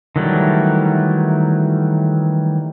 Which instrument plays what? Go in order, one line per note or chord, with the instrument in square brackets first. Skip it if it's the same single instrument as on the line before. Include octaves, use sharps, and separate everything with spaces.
[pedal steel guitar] D#3 E3 F#3 G3 A3